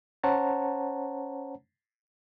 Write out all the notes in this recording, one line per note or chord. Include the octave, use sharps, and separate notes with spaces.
C#4 C5 C#5 F#5 A5 A#5